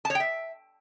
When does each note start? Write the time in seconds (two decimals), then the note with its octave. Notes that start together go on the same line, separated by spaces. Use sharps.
0.05 A5
0.10 C#5
0.15 G5
0.20 E5